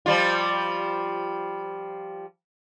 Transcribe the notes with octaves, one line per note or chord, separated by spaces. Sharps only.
F3 G3 F4